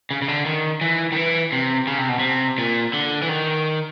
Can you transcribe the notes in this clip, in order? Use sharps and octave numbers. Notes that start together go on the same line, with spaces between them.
C#3
C#3
D3
D#3
E3
D#3
E3
C3
C#3
C3
B2
C3
A#2
D3
E3
D#3